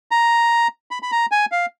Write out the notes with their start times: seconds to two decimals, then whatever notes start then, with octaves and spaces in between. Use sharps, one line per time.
0.11 A#5
0.91 B5
1.03 B5
1.12 A#5
1.32 G#5
1.52 F5